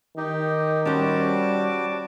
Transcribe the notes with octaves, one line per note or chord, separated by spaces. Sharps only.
D#3 D#4 G4
G3 C#4 F#4 C5 A5 D6